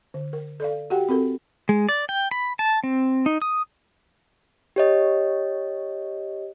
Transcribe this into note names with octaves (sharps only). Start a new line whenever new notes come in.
D3
A#4
A4 D5 F5
F#4 G4 F#5 G5
C4 F#4 A4 A#4
G#3
D5
G5
B5
A5
C4
D#4
D#6
G4 C#5 D#5